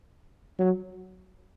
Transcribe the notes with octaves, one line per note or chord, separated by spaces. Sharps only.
F#3